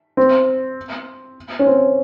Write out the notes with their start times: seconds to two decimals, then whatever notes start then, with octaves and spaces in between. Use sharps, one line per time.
0.17 C4
1.59 C#4
1.66 C4